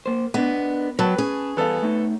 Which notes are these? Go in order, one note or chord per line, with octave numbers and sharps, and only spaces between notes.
A#3 C5
B3 D4 A#4 D#5
F#3 A#4 B4 G5 A5
C#4 G#4
E3 G3 B3 A4 F5
A3 D#4 C#5